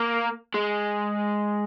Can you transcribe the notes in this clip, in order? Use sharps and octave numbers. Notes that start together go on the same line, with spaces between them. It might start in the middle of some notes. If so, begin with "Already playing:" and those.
Already playing: A#3
G#3